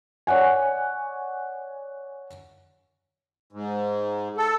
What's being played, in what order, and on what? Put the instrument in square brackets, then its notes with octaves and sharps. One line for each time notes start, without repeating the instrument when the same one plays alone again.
[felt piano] C#5 D5 F#5 G#5
[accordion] G#2
A4